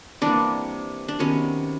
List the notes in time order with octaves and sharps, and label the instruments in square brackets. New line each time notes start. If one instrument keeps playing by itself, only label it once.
[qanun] C3 E3 G3 A#3 D4
D4
C3 D#3 F#3 B3 C#4